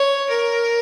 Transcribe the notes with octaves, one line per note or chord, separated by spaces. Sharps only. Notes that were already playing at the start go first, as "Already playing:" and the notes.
Already playing: C#5
A#4